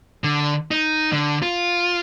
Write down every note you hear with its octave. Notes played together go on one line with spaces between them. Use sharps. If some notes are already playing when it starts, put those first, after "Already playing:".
D3
D#4
D3
F4